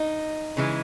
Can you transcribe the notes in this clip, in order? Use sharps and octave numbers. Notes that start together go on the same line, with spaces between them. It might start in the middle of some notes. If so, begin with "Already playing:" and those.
Already playing: D#4
C#3 E3 G#3